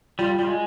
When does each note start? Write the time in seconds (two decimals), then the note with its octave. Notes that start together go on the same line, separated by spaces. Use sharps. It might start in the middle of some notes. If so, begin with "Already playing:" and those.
0.19 G3 F4
0.39 G3 F4
0.47 G#3